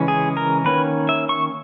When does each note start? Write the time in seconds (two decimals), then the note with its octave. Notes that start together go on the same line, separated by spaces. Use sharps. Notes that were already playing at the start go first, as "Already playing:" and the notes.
Already playing: C#3 E3 G#3 C#4
0.08 G#4
0.37 A#4
0.65 D#3 A#3 C#4 B4
1.09 E5
1.29 C#6